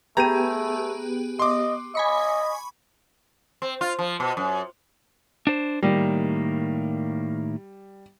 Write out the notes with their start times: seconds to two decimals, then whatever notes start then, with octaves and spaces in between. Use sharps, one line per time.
0.17 A3 B3 G4 G#4 A#5 D#7
1.39 D#5 C6 D6
1.95 D#5 G#5 B5 C#6
3.62 C4
3.81 F4
3.99 F3
4.20 B2
4.37 F#2
5.47 D4 C5
5.83 A2 D#3 G3 A#3